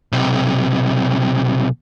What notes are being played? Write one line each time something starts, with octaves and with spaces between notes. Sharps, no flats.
B1 C3